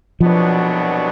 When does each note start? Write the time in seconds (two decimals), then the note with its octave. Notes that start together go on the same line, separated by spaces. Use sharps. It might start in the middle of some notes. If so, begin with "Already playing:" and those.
0.20 C2 B2 F3 F#3 B3 D4